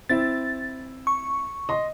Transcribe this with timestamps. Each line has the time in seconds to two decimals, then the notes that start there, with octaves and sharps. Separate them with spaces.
0.09 C4 E4 A6
1.07 C#6
1.69 D#5 C6